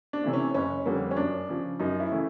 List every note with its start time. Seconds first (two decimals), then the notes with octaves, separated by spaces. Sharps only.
0.13 D4
0.24 C3 E3 A3
0.33 C#4
0.54 F#1 C#4
0.86 F2 D3 G3 A#3
1.11 C#4
1.17 F#2 D4
1.49 C#3 F3
1.79 F#2 D#4
2.00 E4
2.11 C#3 E3 A3